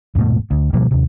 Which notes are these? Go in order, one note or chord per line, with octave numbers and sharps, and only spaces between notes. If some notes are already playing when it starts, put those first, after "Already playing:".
D#1 G#2 B2 A3
D2
B2 F3 G3 A#3
D#2 C3